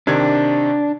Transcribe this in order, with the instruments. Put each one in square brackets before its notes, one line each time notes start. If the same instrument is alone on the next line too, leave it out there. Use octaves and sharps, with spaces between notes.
[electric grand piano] C3 D#3 G#6 [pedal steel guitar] D4